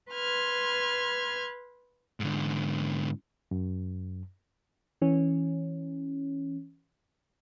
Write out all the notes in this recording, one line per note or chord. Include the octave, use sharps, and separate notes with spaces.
B4 C6 F6 G#6
G#2 D3
F#2
E3 C#4